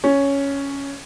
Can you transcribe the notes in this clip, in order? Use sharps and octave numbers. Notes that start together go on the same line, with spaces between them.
C#4